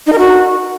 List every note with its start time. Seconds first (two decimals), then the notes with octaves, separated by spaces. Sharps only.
0.07 D#4
0.13 A#4
0.18 F#4